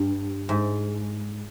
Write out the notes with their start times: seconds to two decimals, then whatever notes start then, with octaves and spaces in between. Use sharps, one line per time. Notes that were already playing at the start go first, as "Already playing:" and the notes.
Already playing: G2
0.49 G#2